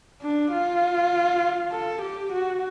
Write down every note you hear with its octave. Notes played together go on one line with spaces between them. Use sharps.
D4
F4
A4
G4
F#4